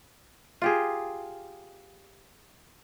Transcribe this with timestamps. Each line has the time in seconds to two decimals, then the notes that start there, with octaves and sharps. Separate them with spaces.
0.62 F4 G4 G#4